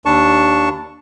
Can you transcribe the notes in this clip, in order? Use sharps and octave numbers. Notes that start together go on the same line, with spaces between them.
D#2 D4 A5 C#6